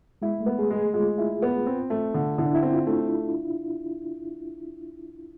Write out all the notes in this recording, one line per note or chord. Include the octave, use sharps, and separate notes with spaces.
G#3 E4
A3
B3
G#4
G#3
G#4
G#3 F4
E4
B3
C4
A3
D3
D3 E4
D4
E4
C4
F4
A3